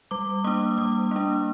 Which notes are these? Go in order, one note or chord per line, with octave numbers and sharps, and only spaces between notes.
G3 D6
A#3 D4 D#6
G3 D#6
A#3 D4